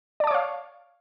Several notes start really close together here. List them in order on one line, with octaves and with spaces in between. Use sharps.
D5 A5 D6 C#5 F5